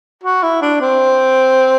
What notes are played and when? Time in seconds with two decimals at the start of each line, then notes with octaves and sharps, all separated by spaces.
0.24 F#4
0.43 E4
0.62 D4
0.81 C4